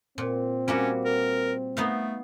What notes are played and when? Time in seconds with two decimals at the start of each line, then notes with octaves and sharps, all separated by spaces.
0.18 A#2 C4
0.68 G3 A#3 C#4 F#4
1.05 A#4
1.77 A3 B3 D#4 F5